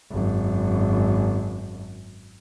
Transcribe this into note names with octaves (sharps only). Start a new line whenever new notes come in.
G#1 F#2